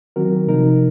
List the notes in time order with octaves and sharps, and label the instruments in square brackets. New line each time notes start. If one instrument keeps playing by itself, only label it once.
[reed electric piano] D#3 F#3 C4 F#4 A#4
C3 F3 A#3 D#4 A#4